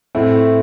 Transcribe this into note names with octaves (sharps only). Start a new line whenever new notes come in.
A2 A3 C4 E4